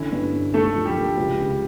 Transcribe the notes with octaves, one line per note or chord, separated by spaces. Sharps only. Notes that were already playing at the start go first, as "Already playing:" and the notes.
Already playing: D3 C#4 E4
G2
D3
D3 A3 A4
F3
G3 G4
A#3
C#2
C#3